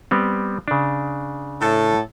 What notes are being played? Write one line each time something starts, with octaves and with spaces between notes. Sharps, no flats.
G3 B3 C4
C#3 D4
A2 A4